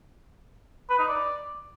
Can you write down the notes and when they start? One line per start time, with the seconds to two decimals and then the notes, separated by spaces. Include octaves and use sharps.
0.90 B4
0.99 D#4
1.08 D5